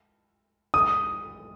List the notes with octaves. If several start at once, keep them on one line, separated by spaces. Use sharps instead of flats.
D#6